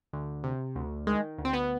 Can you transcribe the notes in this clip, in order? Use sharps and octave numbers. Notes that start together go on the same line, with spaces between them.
D2
C3
D2
D#3 G#3
D2
C4
B3